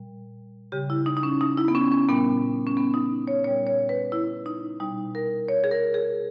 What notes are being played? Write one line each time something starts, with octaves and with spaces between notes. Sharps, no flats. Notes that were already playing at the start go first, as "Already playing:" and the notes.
Already playing: A#2 G3
C#3 G3 G4
E4
D#4
D#4
C#4
D#4
E4
B3
C#4
C#4
A#2 G3 B3
C#4
B3
D#4
C#5
A#2 G3 C#5
C#5
B4
E4
D#4
B2 G3 D#4
A#4
C#5
G#4
A#4
G#4